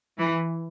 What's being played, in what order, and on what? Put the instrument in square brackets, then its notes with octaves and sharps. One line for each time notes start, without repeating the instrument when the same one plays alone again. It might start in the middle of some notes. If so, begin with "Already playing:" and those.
[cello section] E3